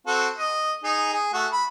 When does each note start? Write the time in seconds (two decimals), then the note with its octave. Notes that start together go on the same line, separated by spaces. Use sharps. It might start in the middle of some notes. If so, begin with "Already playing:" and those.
0.07 C4 F#4 A4
0.38 D#5
0.84 D#4 G#4
1.13 G#4
1.33 A3 F#4
1.53 B5